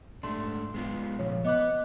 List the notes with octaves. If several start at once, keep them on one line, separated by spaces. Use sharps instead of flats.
G#2 A3 D4 C6
G#3 B3 F4
A#2 C#3 F3 C#5
B3 B4 D#5 D6 F#6